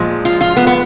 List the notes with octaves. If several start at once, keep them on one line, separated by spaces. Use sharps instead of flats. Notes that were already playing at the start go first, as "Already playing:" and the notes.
Already playing: A#2 F3 G#3
F4
F4
B3
B3